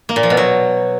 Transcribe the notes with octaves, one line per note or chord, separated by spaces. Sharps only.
A#3
A#2
F3
B2
F#3